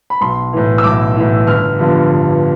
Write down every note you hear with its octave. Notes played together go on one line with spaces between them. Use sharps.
B5
B1 C6
A2 E3
E6
B1 D6
A2 E3
G1 F6
G2 D3 F3 B3
G1